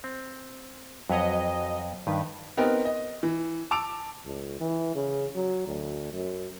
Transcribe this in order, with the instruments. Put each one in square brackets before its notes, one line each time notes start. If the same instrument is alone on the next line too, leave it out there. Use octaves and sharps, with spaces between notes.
[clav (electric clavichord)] C4
[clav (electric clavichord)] F2 B4 C#5 [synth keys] F#3 D#5
[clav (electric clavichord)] G2 [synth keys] D#3 B4
[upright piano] B3 C4 D#4 G4 A#4 B4
D#5
E3
A5 D6 E6 D7 F7
[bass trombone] C#2
E3
C#3
F#3
D2
F#2